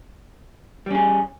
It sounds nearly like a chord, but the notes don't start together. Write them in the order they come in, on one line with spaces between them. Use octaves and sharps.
G3 C#4 G#4